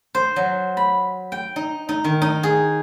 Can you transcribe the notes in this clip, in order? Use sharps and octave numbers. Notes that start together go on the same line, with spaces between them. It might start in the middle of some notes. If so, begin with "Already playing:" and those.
C5
F#3
B5
G5
D#4
D#4
D#3
D#4
G#4